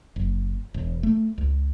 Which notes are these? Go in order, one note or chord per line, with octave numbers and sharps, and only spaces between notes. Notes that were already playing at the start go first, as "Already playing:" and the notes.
F#1
E1
A3
C#2